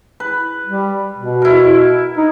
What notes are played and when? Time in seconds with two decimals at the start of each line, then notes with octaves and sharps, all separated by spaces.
0.20 B4
0.65 G3
1.18 B2
1.42 E4 A#4
2.17 D#4